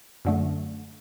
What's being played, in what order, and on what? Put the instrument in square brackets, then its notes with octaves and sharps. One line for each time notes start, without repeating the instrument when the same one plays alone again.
[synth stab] F#2 D3 A3